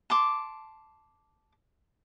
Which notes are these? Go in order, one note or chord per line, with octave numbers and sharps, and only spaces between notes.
A5 C6 D6